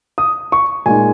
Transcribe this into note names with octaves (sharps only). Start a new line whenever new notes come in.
D#6
C#6
A#2 G#3 D#4 G#5